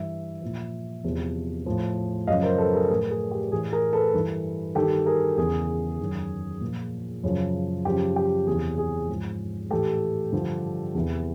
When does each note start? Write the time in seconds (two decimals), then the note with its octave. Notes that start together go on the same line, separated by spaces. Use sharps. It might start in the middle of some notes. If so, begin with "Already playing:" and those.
Already playing: G2 E3 E5
0.42 A#2 F3
1.04 E2 C3 F3
1.66 A2 F3
2.27 F#2 C#3 F3 D#5 F5
2.43 A#4 C5
2.58 A4 B4
2.74 G#4 A#4
2.89 A2 F3 G#4 A#4
3.10 G#4
3.31 G4
3.52 A2 E3 G#4
3.72 G#4 A#4
3.93 A4 B4
4.14 G2 E3
4.75 G2 D#3 G4 A4
5.06 G#4 A#4
5.37 E2 C#3 E3 G#4
5.99 F#2 D#3
6.61 A#2 F3
7.23 F#2 C#3 F3
7.85 F#2 C#3 F3 G4
8.16 G4
8.47 E2 C3 E3 G#4
8.78 G#4
9.09 G#2 F3
9.70 A2 E3 G4 A4
10.32 G2 D3 F3
10.94 E2 C3 E3